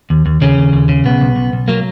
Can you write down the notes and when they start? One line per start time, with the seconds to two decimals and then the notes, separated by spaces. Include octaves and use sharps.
0.10 D#2
0.26 D#2
0.41 D#2 C#3 C#4
0.57 D#2
0.73 D#2
0.89 C#3
1.05 B1 B3
1.21 B1
1.36 B1
1.53 B1
1.68 F#3 A#3